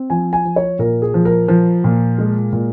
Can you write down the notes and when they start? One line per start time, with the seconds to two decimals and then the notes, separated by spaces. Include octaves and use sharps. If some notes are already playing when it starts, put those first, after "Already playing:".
Already playing: C4
0.10 F3 G#5
0.33 G#5
0.45 F3
0.56 C#5
0.79 A#2 A#4
1.02 G#4
1.14 F3
1.25 A#4
1.48 F3
1.84 A#2
2.18 G#3
2.53 A#2